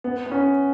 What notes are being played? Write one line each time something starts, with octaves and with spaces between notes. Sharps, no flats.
B3
B3
C#4